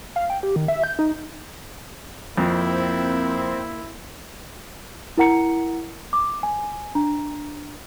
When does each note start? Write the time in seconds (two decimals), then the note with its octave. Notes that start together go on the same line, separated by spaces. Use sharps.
0.16 F5
0.30 G5
0.43 G4
0.56 D#3
0.68 E5
0.84 G6
0.99 D#4
2.38 F2 A#3 C4 E4
5.18 E4 A#4 F#5 A#5 C#7
6.13 D6
6.43 G#5
6.95 D4 A#5